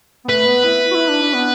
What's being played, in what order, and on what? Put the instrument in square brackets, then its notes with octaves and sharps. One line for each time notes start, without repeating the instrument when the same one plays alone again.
[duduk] B3
[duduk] A3 [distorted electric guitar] B4
[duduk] B3
E4
F#4
E4
D4
D4
B3